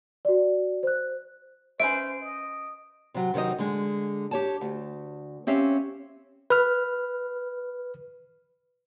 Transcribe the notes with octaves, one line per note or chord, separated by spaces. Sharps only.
F#4 D5
C5 F#6
C#4 B4 C5 E5 D7
D#5
C3 F#3
C3 D#3 F#3 C5 D#5
D3 G#3
G4 C#5 A5
D2
C4 C#4 G4 E5 F5
B4 F6